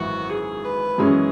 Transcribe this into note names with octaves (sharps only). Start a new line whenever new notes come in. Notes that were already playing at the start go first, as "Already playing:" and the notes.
Already playing: G#1 F#2 E3 F#4
G#4
B4
F#2 E3 G#3 C#4 G#4